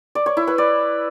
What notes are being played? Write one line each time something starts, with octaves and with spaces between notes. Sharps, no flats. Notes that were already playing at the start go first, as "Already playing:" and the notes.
D5
C#5
E4
B4
D5